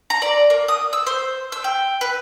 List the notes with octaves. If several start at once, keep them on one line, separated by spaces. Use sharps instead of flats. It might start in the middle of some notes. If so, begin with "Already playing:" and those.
A#5
D5
A#3
D#6
E6
C5
E6
G5
B4